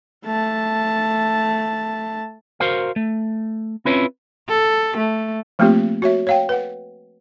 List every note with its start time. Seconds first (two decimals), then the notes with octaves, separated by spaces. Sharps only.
0.25 A3 A5
2.60 F#4 A#4 C5 F5
2.96 A3
3.85 C4 C#4 E4 F4 B4 C#5
4.49 A4
4.97 A3
5.59 F3 A3 A#3 C4 F4 G4
6.02 F#4 C#5 E5
6.27 C#5 F5 G5
6.49 B4 F#5